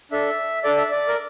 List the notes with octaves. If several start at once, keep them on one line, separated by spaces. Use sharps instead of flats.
D4 A4 E5
D4 A4 D5
E5
D5
A#4